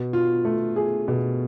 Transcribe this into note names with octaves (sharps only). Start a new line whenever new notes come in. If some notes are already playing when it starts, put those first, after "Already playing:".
Already playing: B2
F4
A3
G#4
B2